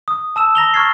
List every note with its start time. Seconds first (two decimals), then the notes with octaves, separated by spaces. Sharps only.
0.08 D#6
0.36 A5 E6 E7
0.55 A#5 A#6 F7 G7
0.74 A#5 C#6 F6 G#6 A6 C7